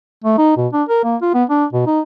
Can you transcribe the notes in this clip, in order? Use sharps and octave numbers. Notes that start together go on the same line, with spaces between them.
A3
D#4
B2
D4
A#4
A#3
F4
B3
D4
B2
D#4